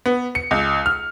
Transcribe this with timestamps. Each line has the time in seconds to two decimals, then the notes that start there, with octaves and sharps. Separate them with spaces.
0.06 B3
0.35 C#7
0.51 C#2
0.86 F6